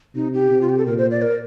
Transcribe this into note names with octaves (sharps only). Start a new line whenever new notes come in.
C3 D#4
G4
C3
F4
G4
A4
A#2 A#4
C5
D5
A#4